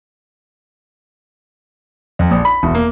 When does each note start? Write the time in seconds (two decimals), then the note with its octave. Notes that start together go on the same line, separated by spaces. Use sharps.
2.19 F2
2.31 A#1
2.45 B5
2.63 E1
2.75 A#3